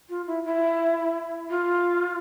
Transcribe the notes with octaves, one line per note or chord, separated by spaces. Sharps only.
F4
E4
E4
F4